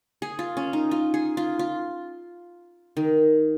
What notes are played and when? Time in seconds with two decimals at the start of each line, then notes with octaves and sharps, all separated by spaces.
0.22 G#4
0.39 F4
0.57 C#4
0.73 D#4
0.91 F4
1.14 G#4
1.37 F4
1.59 F4
2.97 D#3